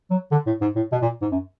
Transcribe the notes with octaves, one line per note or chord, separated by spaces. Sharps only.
F#3
D3
A2
G#2
A2
B2
A#2
G#2
F#2